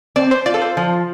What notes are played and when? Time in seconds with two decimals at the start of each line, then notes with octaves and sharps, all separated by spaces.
0.16 C4 D5
0.31 C5
0.46 F4 D5
0.54 A4
0.61 C5
0.77 F3